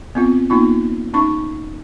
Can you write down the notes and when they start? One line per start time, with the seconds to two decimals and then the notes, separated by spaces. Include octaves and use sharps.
0.15 B3 C4 F4
0.50 A#3 B3 D#4 F4
1.14 C#4 D#4 C#6